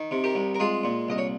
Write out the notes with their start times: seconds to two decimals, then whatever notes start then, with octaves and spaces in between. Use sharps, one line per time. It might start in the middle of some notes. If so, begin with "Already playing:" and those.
Already playing: D#3
0.11 C3
0.24 G4 A#4
0.35 C2
0.55 A#4
0.60 G#3 F4 G#4
0.84 A#2
1.08 C2 D#5
1.18 C#5